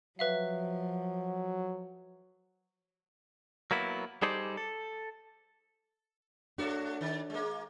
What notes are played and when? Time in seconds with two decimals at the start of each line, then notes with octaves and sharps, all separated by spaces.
0.19 F3 F#3 B4 E5 F5
3.71 F#3 A#3 B3 E4
4.22 G3 D#4 G#4 A4 C5 D5
4.57 A4
6.58 A3 D4 F#4 A4 C#5
7.01 D#3
7.30 G#3 A#3